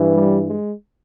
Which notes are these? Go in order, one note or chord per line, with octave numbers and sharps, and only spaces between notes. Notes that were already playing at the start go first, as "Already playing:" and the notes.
Already playing: G2 E3
G3
G#3